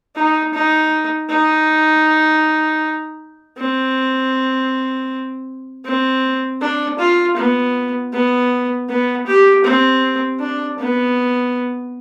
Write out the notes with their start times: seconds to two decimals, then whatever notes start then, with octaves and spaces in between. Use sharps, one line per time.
0.16 D#4
0.54 D#4
1.30 D#4
3.58 C4
5.85 C4
6.61 D4
6.99 F4
7.37 B3
8.13 B3
8.89 B3
9.27 G4
9.64 C4
10.40 D4
10.79 B3